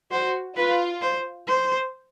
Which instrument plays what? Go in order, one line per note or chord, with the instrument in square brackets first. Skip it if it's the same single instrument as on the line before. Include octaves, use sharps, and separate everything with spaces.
[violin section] F#4 [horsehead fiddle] C5
[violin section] F4 [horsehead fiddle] B4
[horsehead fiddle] C5
C5